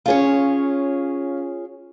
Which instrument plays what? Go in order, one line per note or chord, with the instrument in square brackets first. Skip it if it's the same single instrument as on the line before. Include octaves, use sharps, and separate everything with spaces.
[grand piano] C#4 F5 [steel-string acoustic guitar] F4 G#4 C#5